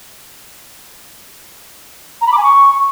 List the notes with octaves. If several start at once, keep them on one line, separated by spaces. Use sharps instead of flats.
A#5
B5
D6
G#5
C#6